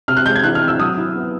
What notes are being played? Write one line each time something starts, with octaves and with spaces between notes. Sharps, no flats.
C3 F6
F#6
G#3 G6
G#6
E3 F#6
F6
C4
E6
F#3 D#6
E4
B3